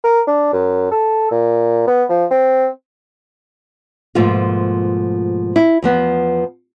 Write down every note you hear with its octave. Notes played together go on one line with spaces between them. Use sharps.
A#4
D4
F#2
A4
A#2
B3
F3
C4
G#2 B2 F3 A3 A#3 F4
E4
E2 F3 B3